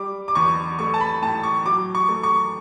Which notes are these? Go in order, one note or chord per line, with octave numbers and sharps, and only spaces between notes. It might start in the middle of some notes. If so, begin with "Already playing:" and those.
Already playing: G3 D6
D6
E2 C#6
A3 C#6
A5
B5
A2 A5
C#6
F#3 D6
C#6
A3
C#6